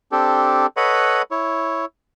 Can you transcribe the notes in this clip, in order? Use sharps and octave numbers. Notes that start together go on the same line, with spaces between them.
C4 D4 G4 A4
A4 B4 C#5 D#5 F#5 B5
E4 C#5